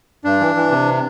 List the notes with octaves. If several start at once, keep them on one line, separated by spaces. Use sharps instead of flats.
G2 D4
E3
E3
C3